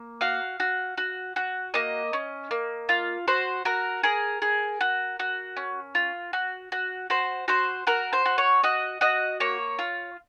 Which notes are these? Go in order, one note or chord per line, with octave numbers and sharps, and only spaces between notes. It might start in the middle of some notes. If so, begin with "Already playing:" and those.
Already playing: A#3
F#4 F5
F#4
F#4
F#4
A#3 D#5
C#4
A#3
F4
F#4 C5
F#4 A#4
G#4 A#4
G#4
F#4
F#4
C#4
F4
F#4
F#4
F#4 C5
F#4 C5
F#4 A#4
C5
F#4
C#5
F#4 D#5
F#4 D#5
A#3 C#5
F4